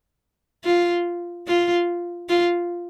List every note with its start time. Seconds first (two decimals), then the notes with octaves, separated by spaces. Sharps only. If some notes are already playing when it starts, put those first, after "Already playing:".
0.64 F4
1.47 F4
2.29 F4